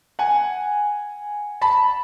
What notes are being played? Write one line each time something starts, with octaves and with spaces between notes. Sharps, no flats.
F#5 G#5
A5 B5